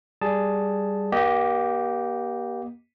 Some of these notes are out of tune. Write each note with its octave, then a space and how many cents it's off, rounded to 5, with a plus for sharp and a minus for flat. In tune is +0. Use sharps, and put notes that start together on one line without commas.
G3 +0 G#4 +0 A5 +0
A#3 +35 G4 -10 D#5 +0